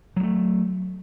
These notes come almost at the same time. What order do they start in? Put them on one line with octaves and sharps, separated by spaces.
F#3 G3 A3